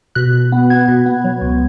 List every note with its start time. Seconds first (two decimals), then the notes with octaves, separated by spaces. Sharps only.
0.15 B2 F#6
0.34 B2
0.52 B3
0.70 B3 G#6
0.88 B2
1.06 B3
1.25 F#3
1.41 C#2